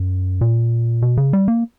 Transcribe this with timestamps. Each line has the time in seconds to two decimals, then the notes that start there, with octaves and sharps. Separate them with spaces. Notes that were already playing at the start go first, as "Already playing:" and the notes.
Already playing: F#2
0.41 A#2
1.02 B2
1.17 C#3
1.33 G3
1.48 A#3